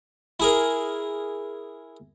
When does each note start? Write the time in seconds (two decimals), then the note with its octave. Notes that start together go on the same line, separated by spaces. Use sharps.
0.40 E4 G#4 A#4